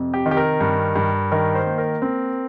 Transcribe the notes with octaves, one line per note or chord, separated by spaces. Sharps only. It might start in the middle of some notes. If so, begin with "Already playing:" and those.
Already playing: F2 C3
G4
D#3
G4
A#4
G2
G2
D#3 A#4
C5
A#3
A#4
C4